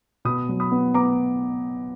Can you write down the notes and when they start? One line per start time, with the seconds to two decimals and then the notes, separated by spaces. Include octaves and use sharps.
0.25 B2 B5 D#6
0.49 F#3
0.60 B5 D#6
0.72 B3
0.94 B3 A#5 D6